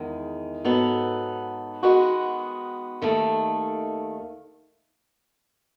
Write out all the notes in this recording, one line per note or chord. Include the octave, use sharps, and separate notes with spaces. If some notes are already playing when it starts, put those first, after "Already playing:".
Already playing: E2 D#3 G#3
G#2 F#3 B3 D#4 A4
D#3 G#3 B3 F#4
D#2 D#3 A3